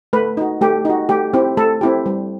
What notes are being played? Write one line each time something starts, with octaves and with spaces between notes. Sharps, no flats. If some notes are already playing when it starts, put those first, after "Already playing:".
A3 B4
D#4 F#4
A3 G4
D#4 F#4
A3 G4
C4 E4 G4
A3 A4
C4 E4 G4
G3